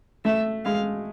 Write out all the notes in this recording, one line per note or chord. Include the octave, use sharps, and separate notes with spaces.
A3 E5
G#3 F5